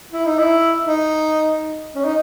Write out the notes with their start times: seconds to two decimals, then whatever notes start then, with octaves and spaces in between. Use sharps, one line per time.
0.12 E4
0.25 D#4
0.39 E4
0.85 D#4
1.95 C#4
2.04 D#4